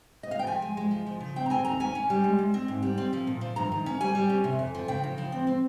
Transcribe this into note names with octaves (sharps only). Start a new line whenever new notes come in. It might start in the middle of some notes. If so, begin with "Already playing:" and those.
D#5
F5
G5
F3 G#5
G#3
G#3
F3
F3
C#3
C4 G5
A#5
C4 G#5
D#2 A#5
C#4 G#5
C#4
G3
G#3
G#3
C4
G#2
G3
C4
F3
A#2
F3
G2 A#5
D#3
C#4
G3 G#5
G3
C#4
C3
F2
F3
C#3 G5
C#3
F3
C4
C4